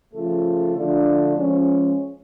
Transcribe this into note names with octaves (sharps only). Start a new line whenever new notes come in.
C#3 F3 A3 F4 A4
D3 F3 A3 D4 F4
F3 G#3 C#4